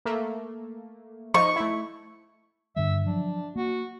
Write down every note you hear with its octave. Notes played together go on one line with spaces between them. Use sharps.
A3 A#3
F3 D#4 C#6
A3 E4
G2 D3 G3 E5
F3 F#3 D4
A#3 F#4